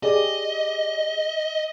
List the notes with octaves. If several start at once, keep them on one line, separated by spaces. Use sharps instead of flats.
G4 G#4 D5 D#5